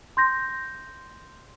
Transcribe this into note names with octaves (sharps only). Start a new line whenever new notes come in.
C6 G6 A#6